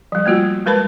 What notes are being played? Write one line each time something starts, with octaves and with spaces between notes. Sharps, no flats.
F3 G3
A3 A#3 F4 F#4
G3 G#3 A#4 B4 A5 B5